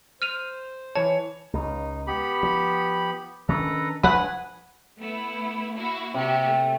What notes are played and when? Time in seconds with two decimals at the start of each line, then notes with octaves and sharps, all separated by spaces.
0.22 C5 F6 D#7 F7
0.95 E3 C#5 A5
1.53 C#2 D#4
2.07 B3 G4 B5
2.43 F3
3.49 D#3 C#4 D4 A4 B4 A#5
4.03 F3 G3 D4 B4 F#5 G#5
4.98 A3 B3 E4
5.76 A#3 E4 F#4
6.14 C3 F#4 G4
6.45 A3